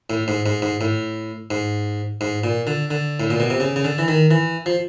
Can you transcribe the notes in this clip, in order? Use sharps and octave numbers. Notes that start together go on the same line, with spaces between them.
A2
G#2
G#2
G#2
A2
G#2
G#2
A#2
D3
D3
A2
A#2
B2
C3
C#3
C#3
D3
E3
D#3
E3
F3